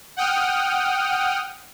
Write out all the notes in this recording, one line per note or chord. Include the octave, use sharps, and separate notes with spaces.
F#5 G5 D#6 F6